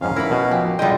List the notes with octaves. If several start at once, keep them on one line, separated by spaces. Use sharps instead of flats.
F2 G#2 C#4 F5
E3 E4 A#4 F#5 B5
B2
F3 G4
D3 G3 G#3 D#4 F4 D#5 G5